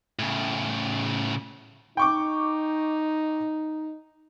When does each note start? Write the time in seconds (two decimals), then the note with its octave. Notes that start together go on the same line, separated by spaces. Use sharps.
0.19 A2 C#3
1.97 D#4 G5 C#6 D6